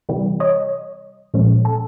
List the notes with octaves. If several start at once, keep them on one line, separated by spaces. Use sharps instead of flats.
C3 E3 G3
C#5 D#5
A#2 F3 G#3 C#4
A4